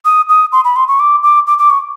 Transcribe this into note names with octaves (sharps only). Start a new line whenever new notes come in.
D#6
D#6
C6
B5
C6
C#6
D6
D6
D6
D6
C#6